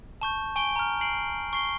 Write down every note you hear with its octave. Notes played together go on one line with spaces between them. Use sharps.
A5 C#6 G6
G#5 C#6 D7 G7
A#5 F6
C7 D7 F#7
C#6 C7 G7